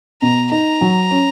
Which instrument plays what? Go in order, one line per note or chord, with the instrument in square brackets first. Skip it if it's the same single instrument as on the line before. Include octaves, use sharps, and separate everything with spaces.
[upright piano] B2 [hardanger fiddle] A#5
[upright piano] D#4 [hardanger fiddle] A#5
[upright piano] F#3
C#4